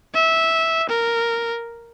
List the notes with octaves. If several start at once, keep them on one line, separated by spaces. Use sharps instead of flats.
E5
A#4